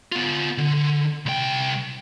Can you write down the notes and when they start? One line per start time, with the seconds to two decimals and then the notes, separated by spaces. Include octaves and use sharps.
0.12 B3 F4
0.58 D3
1.26 C2 G5